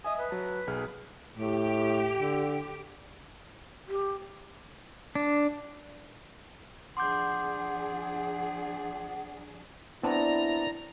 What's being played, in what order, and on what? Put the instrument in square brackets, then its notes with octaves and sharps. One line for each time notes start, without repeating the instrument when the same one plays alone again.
[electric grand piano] D#5 E5 G#5 [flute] D#6
[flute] B4
[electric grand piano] F#3 A5
B1 G#4 F6
[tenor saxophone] A2 [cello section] G4
[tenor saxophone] D3
[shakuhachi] G4
[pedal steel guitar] D4
[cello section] F3 D4 G#4 [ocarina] F#5 [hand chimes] C6 D6 G6
[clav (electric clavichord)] B3 C4 D4 [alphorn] E4 [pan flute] D5 [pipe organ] A#5